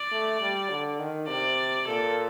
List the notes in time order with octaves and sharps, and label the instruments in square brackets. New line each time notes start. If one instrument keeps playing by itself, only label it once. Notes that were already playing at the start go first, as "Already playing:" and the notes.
Already playing: [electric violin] D5
[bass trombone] A3
G3
D3
D#3
[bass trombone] C3 [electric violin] D5
[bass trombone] A#2 [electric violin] A4